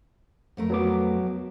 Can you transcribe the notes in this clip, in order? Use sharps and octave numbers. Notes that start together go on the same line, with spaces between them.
F2 A3 A#4
F#3 B3 D6